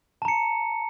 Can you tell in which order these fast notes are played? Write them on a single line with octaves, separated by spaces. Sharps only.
A5 A#5 C#7